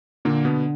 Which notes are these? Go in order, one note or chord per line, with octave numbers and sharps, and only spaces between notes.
A#2 D3 A#3
B2 B3